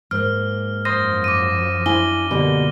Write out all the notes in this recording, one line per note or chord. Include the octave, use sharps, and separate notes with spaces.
G#2 A#3 F6
F#2 F3 C5 C6 D#6 A#6
D6 D#7
D4 E4 G#5 G7
B2 D3 G3 A#3